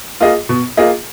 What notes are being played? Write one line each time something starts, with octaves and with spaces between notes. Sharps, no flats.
A#3 F4 G#4 D#5
B2
A#3 F4 G#4 D#5